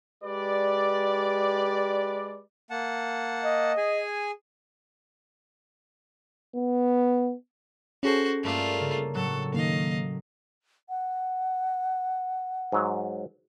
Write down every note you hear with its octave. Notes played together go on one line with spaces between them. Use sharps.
G#3 G4 B4 D5
A#3 F#5 A5
D#5
G#4 G#5
B3
C#4 F#4 G#4 A4 C5
G2 A3 A#3 F4 D5
C#3
A2 F#3 A4 C#6
D#3 A#3 D#5 F5
F#5
G#2 F#3